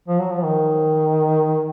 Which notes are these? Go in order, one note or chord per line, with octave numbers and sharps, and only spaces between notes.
F3
F#3
F3
D#3